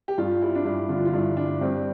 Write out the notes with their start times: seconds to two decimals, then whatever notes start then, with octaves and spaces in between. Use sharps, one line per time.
0.08 G4
0.18 G2 F4
0.42 G3 E4
0.55 D4
0.65 G2 E4
0.89 D3 F4
1.05 F4
1.13 G2 E4
1.37 G3 D4
1.61 G2 C4